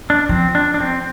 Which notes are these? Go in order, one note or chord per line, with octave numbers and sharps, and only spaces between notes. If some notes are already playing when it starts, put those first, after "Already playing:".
D4
F3 C4
D4
D4
C4